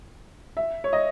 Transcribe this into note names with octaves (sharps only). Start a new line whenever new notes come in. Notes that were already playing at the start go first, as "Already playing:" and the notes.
E5
C#5
D#5